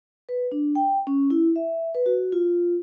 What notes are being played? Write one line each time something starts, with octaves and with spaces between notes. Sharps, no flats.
B4
D4
G5
C#4
E4
E5
B4
F#4
F4